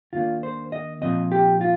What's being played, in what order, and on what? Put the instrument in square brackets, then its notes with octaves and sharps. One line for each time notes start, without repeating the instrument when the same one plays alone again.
[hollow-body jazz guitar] D#2 D#3 A#3 D4 F4
C5
D#5
A#2 F3 C4 D#5
G4
F4